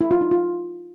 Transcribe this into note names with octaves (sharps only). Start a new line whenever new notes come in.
E4
F4
D#4
F4